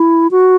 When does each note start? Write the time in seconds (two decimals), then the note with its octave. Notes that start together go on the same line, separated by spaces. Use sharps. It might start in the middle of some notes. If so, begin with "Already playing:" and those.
Already playing: E4
0.31 F#4